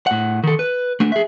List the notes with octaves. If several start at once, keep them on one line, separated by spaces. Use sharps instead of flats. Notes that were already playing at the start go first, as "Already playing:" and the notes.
A2 F#5
D#3 A4
B4
A3 D4
G#4 E5